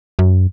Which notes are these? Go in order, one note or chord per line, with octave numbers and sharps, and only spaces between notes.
F#2